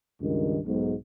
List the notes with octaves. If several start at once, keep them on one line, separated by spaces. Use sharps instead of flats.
C#2 G2 D#3
B1 G#2